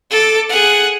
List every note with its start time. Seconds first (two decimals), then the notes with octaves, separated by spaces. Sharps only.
0.11 A4 D6
0.49 G#4 F#5